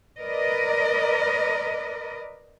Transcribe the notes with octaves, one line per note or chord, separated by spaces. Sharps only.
A#4 B4 D5 D#5